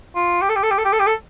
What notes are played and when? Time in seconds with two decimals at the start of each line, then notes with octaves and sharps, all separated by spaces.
0.16 F4
0.42 G4
0.49 A4
0.56 G4
0.63 A4
0.71 G4
0.78 A4
0.85 G4
0.93 A4
1.00 G4
1.07 A4